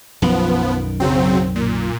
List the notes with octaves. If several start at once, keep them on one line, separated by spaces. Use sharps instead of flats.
B1 F#2 D#3 F3 B3
C#3 F#3 C4
A#2